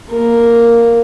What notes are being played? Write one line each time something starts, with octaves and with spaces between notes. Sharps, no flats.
A#3 A#4